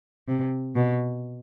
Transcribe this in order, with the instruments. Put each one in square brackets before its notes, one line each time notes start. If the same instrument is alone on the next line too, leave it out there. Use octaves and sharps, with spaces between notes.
[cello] C3
B2